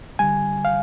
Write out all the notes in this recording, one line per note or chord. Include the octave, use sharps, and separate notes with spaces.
D3 G3 G#5
F5